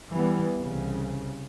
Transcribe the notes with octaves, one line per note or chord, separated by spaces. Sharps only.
E3 G3 B3
C2 C#3